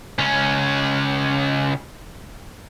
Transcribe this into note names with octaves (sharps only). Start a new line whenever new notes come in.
C#2 C#4